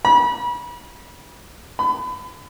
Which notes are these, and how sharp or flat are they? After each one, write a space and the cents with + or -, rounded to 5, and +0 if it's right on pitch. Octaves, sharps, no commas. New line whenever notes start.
B5 -35
B5 +30